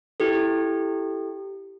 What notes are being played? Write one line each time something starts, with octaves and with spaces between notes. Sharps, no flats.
E4 G4 A4